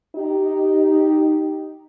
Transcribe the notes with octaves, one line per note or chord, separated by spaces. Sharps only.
D#4 G4